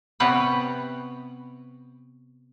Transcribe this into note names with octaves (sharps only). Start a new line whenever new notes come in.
C3 B3 B4 C#5 F#5 G5